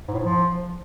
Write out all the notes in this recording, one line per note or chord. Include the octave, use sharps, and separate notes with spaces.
G#2
A2
G#2
F3